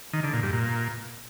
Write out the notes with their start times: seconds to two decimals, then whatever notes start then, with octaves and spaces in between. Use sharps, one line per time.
0.13 D#3
0.23 D3
0.33 A#2
0.43 G2
0.53 A#2